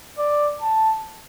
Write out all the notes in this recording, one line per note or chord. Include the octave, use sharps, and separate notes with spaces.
D5
A5